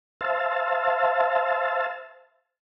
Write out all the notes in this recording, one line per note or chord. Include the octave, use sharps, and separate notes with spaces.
C5 E5 F5 A5